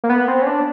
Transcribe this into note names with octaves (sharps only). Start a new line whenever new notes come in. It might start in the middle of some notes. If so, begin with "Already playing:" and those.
A#3
B3
C4
C#4
D4